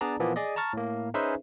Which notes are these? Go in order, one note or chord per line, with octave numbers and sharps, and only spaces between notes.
B3 D4 G#4 D5 A5 A#5
A#2 E3 F3 A#3 B3
G#4 D5 D#5
A5 A#5 C#6 F6 A6
A2 A#3
C#4 D#4 G#4 B4 C5 E5